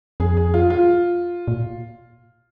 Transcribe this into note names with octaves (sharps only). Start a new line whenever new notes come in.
F2 G#4
G#4
F4
F4
A#2